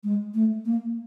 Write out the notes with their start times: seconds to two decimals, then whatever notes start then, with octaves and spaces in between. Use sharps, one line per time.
0.04 G#3
0.34 A3
0.65 A#3